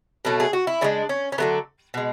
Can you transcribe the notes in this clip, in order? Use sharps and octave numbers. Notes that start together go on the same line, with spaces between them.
B2 F#3 A3
G#4
F#4
E4
C#3 E3 G#3 D4
C#4
C#4
D3 F#3 A3 B3
B2 G#3